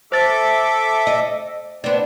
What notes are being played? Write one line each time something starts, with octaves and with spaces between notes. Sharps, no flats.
A4 C5 E5 D6 A6
D#5
B3 C4 D4